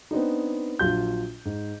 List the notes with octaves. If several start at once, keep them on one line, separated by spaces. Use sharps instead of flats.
B3 C4 D4 D#4
A#1 F#3 F4 G6
G#2